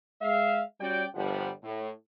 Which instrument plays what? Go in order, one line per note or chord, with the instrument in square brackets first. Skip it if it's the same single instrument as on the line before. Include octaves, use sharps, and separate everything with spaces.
[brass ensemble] G#3 E5 F5
G3 C#4 F#4 D5 G5
G1 F3 G3 F#5
A2